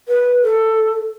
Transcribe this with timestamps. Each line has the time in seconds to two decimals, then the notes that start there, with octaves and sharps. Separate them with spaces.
0.08 B4
0.44 A4